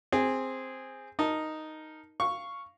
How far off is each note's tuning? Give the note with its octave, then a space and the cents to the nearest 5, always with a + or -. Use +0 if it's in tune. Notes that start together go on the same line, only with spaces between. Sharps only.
C4 +0 G#4 -10
D#4 +0 A#4 +0 A5 +10
F5 -5 C#6 +0